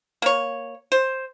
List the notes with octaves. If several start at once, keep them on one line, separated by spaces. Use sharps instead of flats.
A#3 C#5
C5